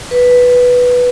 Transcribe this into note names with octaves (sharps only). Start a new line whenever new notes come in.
B4